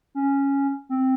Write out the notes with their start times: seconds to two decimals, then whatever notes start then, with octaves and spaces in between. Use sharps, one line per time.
0.15 C#4
0.89 C4